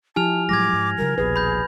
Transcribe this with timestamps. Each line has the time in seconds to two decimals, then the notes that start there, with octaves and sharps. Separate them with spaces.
0.16 F3 E4 G4 G#5 A5 F6 F7
0.49 A2 F#3 G#3 D6 G#6 A#6
0.73 G#2
0.98 C#3 F#3 G3 A#4
1.18 D#1 A#1 B2 G#4 B4
1.36 B5 G6